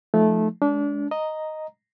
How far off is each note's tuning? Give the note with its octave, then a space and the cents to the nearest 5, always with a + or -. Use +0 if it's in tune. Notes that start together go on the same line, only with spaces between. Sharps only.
F3 +0 A3 -20 D#4 -5
G#3 +15 D4 -30
D#5 +0 A#5 +0